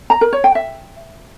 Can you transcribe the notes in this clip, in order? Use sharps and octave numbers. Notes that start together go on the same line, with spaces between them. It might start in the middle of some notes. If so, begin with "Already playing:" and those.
A#5
A#4
C#5
G5
E5